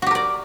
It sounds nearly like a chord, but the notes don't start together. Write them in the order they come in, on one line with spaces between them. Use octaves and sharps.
F#4 G4 A#4 D5